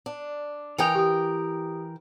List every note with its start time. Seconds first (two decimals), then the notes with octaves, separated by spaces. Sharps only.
0.06 D4
0.78 E3 A#4 G5 G#5 D#6 F7
0.95 G4 D#6